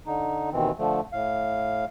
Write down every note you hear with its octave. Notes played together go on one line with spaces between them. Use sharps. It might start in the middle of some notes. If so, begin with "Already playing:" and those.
D3 D#4
D#2 B2 D#3 E3 C4
D3 F3 A3
A2 F5